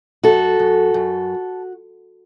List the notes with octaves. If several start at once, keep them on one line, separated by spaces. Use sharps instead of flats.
F#2 F#4 A4
F#2
F#2